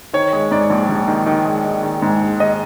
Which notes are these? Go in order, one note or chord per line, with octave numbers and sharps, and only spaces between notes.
D#3 C#5
G#3
G#2 D5
A#1
A#1
D#3
D#3
G#3
D#3
D#3
G#2
G#3
D#3 D#5